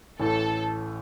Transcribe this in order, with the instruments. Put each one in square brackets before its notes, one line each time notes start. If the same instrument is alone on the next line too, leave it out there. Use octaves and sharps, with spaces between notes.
[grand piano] A1 A2 A3 [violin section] A4